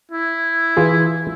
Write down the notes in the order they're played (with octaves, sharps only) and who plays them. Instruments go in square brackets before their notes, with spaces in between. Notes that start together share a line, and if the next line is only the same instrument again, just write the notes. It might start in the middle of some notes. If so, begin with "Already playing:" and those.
[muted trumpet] E4
[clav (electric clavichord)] E3 F4 G#4